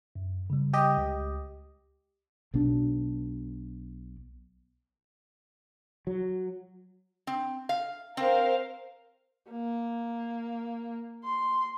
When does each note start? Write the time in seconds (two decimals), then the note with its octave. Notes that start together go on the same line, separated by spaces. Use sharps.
0.16 F#2
0.50 C#3 G3
0.74 G4 D#5
0.97 C#2
2.54 B1 B2 D4
6.07 F#3
7.27 C4
7.69 F5
8.17 C4 A#4 C5 F5
9.51 A#3
11.25 C6